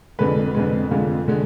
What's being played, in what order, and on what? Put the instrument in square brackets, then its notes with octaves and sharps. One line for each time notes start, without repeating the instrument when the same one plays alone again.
[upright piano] F2 D3 G#3 B4
F2 D3 G#3
F2 D3 G#3 F4
D3 G#3